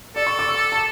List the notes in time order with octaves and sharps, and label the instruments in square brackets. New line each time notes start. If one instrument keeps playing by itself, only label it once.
[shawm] A4 [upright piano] D5
[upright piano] C#6
D6
E6
A5